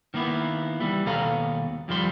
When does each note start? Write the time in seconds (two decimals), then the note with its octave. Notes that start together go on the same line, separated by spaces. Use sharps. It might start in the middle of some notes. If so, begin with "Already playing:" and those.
0.14 D#3 A#3 B3 E4
0.80 E3 G3
1.06 D#2 B2 A4 D#5 F5 A#5
1.88 F2 D#3 F3 G3 C6